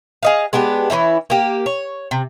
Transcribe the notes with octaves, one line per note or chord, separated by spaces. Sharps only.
G#4 D#5 F5
G#3 B3 D4 G4
E3 G3 C#4 E4
A#3 G4
C#5
C3